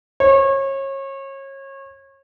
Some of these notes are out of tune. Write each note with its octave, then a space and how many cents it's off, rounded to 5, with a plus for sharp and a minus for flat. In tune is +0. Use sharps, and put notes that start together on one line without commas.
C#5 -30